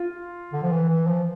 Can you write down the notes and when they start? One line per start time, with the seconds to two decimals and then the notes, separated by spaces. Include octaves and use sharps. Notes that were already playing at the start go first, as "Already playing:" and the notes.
Already playing: F4
0.53 D3
0.63 F3
0.72 E3
0.89 E3
1.07 F3